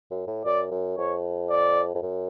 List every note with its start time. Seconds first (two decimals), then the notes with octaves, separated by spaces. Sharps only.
0.11 F#2
0.27 A2
0.45 F#2 D5
0.71 F#2
0.98 F2 C#5
1.50 D5
1.95 F2
2.03 F#2